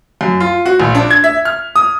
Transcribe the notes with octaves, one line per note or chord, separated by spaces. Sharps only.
F#2
F4
F#4
A#1
D4
G#6
E5
F6
D#6